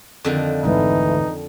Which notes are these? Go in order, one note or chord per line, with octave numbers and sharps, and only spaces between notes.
F2 D3 D#3
G#1 D2 E3 D#4